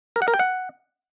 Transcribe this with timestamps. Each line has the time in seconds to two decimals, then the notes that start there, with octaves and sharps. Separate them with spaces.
0.16 A#4
0.22 F#5
0.28 A#4
0.34 G5
0.39 F#5